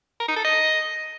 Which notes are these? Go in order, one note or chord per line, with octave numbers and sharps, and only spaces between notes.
A#4
D#4
A4
D#5